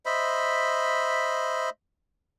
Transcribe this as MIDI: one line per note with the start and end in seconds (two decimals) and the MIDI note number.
0.06 1.70 72
0.06 1.70 75
0.06 1.70 76
0.06 1.70 83